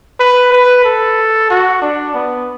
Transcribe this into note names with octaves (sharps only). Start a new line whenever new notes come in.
B4
B4
A4
F#4
D4
B3